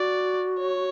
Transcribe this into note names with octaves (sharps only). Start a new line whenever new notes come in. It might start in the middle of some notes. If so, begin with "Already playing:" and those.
Already playing: F#4 D5
C#5